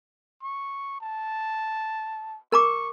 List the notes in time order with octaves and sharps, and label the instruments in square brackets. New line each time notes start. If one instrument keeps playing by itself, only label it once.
[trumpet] C#6
A5
[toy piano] A#4 A#5 D6 [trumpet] C#6